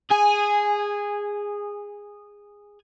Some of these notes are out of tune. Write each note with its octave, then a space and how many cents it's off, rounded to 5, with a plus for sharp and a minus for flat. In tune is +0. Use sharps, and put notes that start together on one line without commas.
G#4 -15 G#5 +0